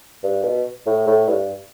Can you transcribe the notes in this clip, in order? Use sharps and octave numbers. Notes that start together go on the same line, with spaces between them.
G2
B2
A2
A2
G2